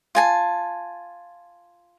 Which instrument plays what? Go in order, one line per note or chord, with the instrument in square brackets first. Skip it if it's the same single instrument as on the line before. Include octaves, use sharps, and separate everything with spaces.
[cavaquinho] F4 G#5 A5